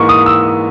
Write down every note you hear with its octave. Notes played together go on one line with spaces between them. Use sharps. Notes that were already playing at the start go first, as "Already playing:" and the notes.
Already playing: G#2 E3 A#3 C#6
D#6
E6